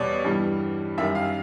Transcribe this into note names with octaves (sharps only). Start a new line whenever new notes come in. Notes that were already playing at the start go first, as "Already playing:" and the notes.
Already playing: E2 B2 G3 C#5 D5
G2 E3 G3
F#2 D#3 G3 E5
F5